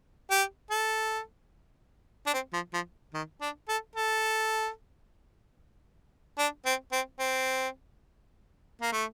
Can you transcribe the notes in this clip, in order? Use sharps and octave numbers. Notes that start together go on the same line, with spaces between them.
G4
A4
D4
C4
F3
F3
D#3
D4
A4
A4
D4
C4
C4
C4
A#3
A3